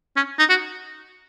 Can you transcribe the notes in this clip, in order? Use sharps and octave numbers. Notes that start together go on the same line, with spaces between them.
C#4
D#4
F#4